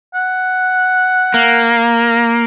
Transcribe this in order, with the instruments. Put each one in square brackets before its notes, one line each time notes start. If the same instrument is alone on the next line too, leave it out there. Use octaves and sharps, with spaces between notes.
[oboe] F#5
[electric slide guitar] A#3